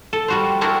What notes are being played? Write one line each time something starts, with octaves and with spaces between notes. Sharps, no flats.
A4
G3 F#4 C5
C4 D4 E4 F#4 A#4